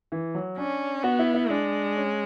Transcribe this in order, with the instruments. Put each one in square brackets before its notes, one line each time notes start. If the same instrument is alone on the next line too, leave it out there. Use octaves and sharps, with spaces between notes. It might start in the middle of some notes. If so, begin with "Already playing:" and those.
[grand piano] E3
F#3
[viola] C#4 [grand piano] D4
[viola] B3 [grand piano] F#4
[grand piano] E4
E4
[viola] G#3 [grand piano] D4
[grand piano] C#4